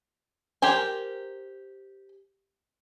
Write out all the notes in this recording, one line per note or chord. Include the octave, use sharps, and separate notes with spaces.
G4 A#4 C5 G#5